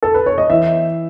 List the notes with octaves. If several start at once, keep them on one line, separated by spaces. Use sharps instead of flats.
A4
B4
C#5
D#5
E3 E5